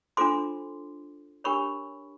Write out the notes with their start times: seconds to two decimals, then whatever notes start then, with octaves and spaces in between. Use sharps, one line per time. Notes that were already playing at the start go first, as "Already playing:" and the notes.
0.17 D4 F4 A4 C5 C6 D6
1.44 D4 G4 A#4 C#5 B5 C#6